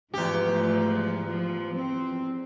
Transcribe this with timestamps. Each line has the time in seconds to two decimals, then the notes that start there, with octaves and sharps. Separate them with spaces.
0.14 E2 G#2 F3 A3 G4
1.25 F3
1.75 C4